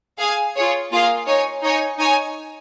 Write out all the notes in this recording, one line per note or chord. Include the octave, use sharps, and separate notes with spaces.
G#4 F5 G#5
F4 G#4 C#5
A#3 F4 G#4 F5
D#4 C#5 G#5
D#4 C#5 G#5
D#4 C#5 G#5